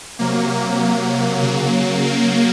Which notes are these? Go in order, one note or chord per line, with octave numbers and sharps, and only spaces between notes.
C3 F#3 A#3
A#3
C#3 F#3
A#3